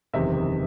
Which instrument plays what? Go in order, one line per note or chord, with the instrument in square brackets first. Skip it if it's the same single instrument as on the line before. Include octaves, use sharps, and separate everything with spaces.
[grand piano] F#1 E2 C3 D#3 E5